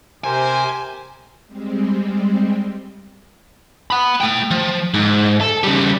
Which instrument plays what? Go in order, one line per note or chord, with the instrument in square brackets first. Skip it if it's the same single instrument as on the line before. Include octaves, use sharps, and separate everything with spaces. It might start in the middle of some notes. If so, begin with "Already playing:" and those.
[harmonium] C3 [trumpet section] G4 A#4 C5 [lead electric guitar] G#5
[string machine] G3 G#3 C4
[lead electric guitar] F#5 B5
A3 G5
F3
G#2
A4
C#3 G3